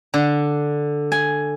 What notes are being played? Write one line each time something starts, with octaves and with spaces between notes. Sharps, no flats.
D3
G#5